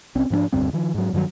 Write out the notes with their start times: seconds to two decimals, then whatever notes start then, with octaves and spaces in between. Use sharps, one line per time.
0.15 C2 C4 C#4
0.30 G#2 F3 B3 D4
0.53 F1 D2 G2 C4
0.73 D#3 F3
0.94 G#2 F#3
1.13 G2 D#3 E3 F#3